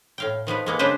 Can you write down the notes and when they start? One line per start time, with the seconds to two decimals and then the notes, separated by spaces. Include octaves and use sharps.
0.18 A2 F5 G5
0.47 D#3 F3 B3 B4
0.66 G#3 A#3 B3
0.79 C#3 F#3 D4 B4 C5